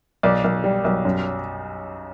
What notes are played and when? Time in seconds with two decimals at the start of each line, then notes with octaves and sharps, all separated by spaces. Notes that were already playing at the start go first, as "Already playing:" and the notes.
0.23 B1 D5
0.44 B1
0.64 G3
0.84 B1
1.05 F#2